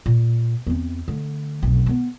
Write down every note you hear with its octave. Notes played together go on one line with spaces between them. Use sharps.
A#2
E2 C4
D3 A3
F1 B1
F3 B3